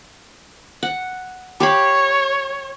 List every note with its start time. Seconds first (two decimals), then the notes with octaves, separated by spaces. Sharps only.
0.83 F#5
1.60 G4 C#5 F5 B5